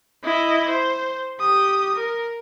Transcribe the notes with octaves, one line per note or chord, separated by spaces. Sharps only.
E4 D#5
C5
G4 D#6
A#4